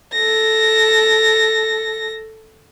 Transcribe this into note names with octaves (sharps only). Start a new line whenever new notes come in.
A4 A#6